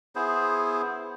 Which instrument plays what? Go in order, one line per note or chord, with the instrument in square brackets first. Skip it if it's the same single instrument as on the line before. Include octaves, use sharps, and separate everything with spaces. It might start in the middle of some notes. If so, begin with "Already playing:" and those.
[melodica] B3 E4 G#4 C5